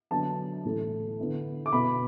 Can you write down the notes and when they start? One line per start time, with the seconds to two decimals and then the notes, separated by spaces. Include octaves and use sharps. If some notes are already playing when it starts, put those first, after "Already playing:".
0.11 D3 F#3 B3 D4 A5
0.65 A2 E3 A3 E4
1.19 D3 B3 E4
1.66 D6
1.72 B2 B3 E4 B5